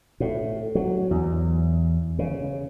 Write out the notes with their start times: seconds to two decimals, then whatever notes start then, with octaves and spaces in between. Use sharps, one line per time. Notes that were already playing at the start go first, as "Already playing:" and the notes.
0.20 A2
0.75 F#3
1.11 E2
2.19 C#3